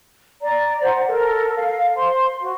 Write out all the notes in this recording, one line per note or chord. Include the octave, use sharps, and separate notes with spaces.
D5 A#5
C5 F#5 A#5
A4 A#4
F5
C5 C6
F#4